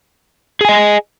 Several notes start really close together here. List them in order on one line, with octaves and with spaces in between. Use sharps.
G#4 G#5 D#5